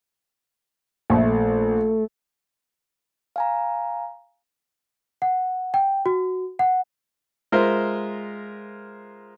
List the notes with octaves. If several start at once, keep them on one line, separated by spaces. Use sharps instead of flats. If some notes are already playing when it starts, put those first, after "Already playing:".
A#1 A3
F5 G#5 A#5
F#5
G5
F#4
F#5
G#3 F4 A#4 C5 E5